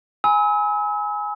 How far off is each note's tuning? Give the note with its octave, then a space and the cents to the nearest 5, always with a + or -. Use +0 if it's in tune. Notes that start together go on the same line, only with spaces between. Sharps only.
G#5 +0 B5 +0 E6 -40